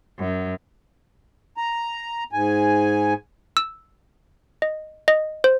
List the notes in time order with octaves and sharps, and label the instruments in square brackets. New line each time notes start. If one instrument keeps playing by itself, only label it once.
[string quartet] F#2
[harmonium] A#5
G#2 G#5
[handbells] E6
D#5
D#5
C5